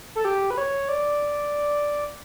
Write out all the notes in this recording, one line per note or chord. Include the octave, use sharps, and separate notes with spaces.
A4
G4
B4
C#5
D5